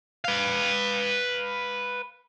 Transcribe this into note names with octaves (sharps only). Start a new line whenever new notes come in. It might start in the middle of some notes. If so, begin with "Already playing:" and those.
B4 F5